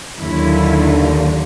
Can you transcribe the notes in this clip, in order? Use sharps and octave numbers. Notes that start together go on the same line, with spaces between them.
D#2 D3 F#3 A#3 E4